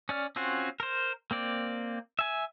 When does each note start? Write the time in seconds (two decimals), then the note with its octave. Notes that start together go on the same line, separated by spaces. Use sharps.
0.09 C#4 D5 F6
0.36 C4 C#4 F4 F#4
0.80 A#4 C5
1.31 A#3 C4 D5
2.19 E5 G#5